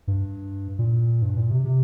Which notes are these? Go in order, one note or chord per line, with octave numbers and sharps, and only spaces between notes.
G2
A#2
G2
A#2
C3
C3